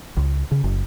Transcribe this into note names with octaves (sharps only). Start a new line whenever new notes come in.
C#2
C#3
F#1